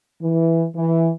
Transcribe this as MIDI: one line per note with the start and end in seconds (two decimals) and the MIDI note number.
0.22 0.66 52
0.76 1.11 52